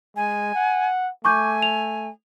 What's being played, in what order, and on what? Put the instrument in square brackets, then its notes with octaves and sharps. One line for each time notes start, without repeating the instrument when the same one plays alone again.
[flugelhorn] G#3 [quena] G#5
[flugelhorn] F#5
[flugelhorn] A3 [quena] G#5 [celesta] C#6 D6 G6
[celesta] F7